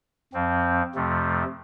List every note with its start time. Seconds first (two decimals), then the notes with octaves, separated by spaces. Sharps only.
0.33 F2 F3 C4
0.95 F2 C3 F3 A3